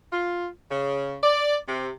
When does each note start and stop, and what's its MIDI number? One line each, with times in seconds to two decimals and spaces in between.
0.12 0.47 65
0.70 1.15 49
1.23 1.56 74
1.67 1.89 48